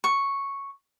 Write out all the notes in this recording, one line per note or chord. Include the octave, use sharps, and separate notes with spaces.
C#6